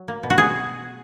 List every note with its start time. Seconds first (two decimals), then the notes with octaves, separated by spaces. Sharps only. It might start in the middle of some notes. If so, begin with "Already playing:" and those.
Already playing: F#3
0.08 A#3
0.23 B2
0.30 F#4
0.38 B2 G#4